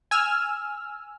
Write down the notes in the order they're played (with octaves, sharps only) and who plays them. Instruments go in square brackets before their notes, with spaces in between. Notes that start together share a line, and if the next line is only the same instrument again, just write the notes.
[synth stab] G#5 E6 F6